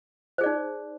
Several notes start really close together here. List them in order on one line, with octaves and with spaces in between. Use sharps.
C5 G#4 D5 D#4